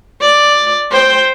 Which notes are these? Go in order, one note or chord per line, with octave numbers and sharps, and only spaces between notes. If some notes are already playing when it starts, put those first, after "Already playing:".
D5
C5 G5